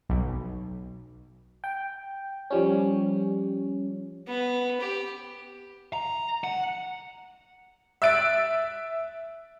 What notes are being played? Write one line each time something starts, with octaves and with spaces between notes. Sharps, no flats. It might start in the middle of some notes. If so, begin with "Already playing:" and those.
B1
G5
F3 G3 C#4
B3
G4
A#5
F#5
E5 E6 F#6 A6 D7